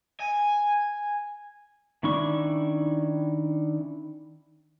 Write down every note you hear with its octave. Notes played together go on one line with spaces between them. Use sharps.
G#5
D#3 C#4 D4 E4 C#6